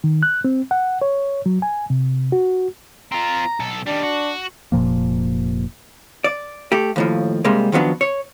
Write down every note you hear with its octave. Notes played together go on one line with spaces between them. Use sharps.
D#3
F#6
C4
F#5
C#5
F#3
G#5
C3
F#4
C4 F4 A#5
B1 A4
D#3 G3 D4
F#4
F1 A#2 F3 A#3
D5
A3 G4
D#2 A2 F3
C3 G3 G#3 A#3
D#3 F3 F#3 B3 D4
C#5